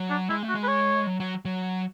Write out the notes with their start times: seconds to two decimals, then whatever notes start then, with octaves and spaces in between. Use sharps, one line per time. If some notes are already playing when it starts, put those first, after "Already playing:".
Already playing: F#3
0.10 D4
0.29 G#3 E4
0.43 A3
0.49 F#4
0.55 G#3
0.63 B4
0.68 C#5
1.07 F#3
1.20 F#3
1.45 F#3